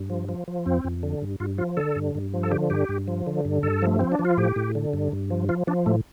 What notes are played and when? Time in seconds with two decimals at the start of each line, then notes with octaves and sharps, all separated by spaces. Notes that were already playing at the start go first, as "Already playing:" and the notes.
Already playing: G2
0.10 F3
0.29 F3
0.48 F3
0.66 F2 C4
0.84 F2
1.03 D3
1.22 G2
1.40 G2 F4
1.58 F3 F4
1.77 D3 A4
1.96 G2
2.15 G2
2.34 F3
2.43 A4
2.51 D3 G4
2.70 G2 G4
2.89 G2
3.08 F3
3.27 D3
3.45 G2
3.63 G2 A4
3.82 F3 A3
3.99 F3 C4
4.12 D4
4.19 F3
4.25 F4
4.37 A2 G4
4.56 A2
4.75 D3
4.93 G2
5.12 G2
5.30 F3
5.49 F3 F4
5.67 F3 D4
5.86 A2 A3